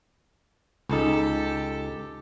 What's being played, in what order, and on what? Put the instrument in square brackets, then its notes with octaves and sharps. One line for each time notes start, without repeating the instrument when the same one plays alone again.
[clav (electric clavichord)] C#2 D#4 [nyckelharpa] G4 A4